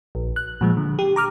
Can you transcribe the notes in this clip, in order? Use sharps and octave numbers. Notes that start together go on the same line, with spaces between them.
A#1
F#6
A#2 F3 G#3
D3
G4
A#5 D6 F6